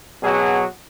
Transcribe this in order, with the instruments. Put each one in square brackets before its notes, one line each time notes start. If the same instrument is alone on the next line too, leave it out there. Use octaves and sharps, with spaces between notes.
[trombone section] B2 F#3 F#4 G#4